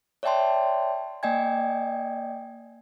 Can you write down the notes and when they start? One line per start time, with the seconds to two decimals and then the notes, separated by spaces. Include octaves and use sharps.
0.23 C#5 D5 E5 G5 A5 C6
1.23 A#3 D5 D#5 G5 G#5 G#6